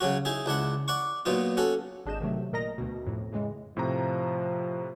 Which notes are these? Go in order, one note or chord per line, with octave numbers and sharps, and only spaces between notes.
C#3 F#3 C#4 F#4
D#4 E4 G#4
C#2 D4 E4 F#5
D5 F#5 C#6
A#2 F#3 B3 D#4 F4
C#4 F#4 A4
G#1 D4 G#4 D#5 G6 E7
C3 D#3 F#3 A3
A#2 A#4 D#5 A#5 A#6
D2 B2
F2 A2
A2 C#3 E3 G#3
A2 C3 F3 A#5